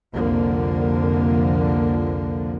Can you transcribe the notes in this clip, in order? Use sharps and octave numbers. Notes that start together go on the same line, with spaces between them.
C2 F2 D3 F3 A#3